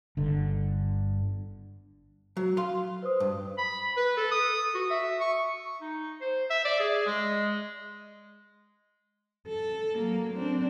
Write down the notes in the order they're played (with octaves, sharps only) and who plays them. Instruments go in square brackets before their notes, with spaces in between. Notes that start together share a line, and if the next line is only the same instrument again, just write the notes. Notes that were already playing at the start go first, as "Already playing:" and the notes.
[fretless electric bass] G1 D3
[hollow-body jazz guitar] F#3
F5 C6
[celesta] B4 C5 D#6
[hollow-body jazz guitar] G2
[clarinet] B5
B4
A4
D#6
F#4
E5
C#6
D#4
C5
E5
D5
G#4
G#3
[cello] A4
F#3 A#3
C4 D4